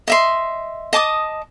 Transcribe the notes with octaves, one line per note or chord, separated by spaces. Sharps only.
D#5 E5 C6
D#5 A5 D6 D#6